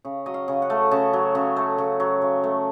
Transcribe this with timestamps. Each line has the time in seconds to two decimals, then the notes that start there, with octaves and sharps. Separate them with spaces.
0.05 C#3
0.26 F#3 D#5
0.34 F5
0.48 C#3
0.62 F#5
0.70 A3
0.91 C#3 A5
1.13 F#3
1.35 C#3
1.56 A3
1.78 C#3
2.00 F#3
2.22 C#3
2.43 A3